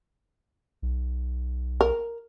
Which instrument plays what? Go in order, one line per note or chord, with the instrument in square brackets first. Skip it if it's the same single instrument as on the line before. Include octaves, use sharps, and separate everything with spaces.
[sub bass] B1
[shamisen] A#4